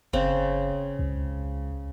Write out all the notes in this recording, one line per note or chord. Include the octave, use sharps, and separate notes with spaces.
F#1 C#3 C4
C#2